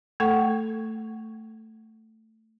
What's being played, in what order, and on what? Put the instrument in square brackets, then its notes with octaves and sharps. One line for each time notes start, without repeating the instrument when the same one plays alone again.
[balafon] A3 A4 F#5 C#6